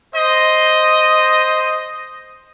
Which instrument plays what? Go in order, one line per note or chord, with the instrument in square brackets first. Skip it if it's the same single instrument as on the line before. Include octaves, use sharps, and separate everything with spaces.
[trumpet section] C5 D#5